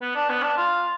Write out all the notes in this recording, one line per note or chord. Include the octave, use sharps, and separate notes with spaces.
B3
D4
B3
D4
F4